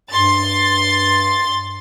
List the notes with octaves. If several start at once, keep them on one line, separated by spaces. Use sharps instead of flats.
G2 C6 A6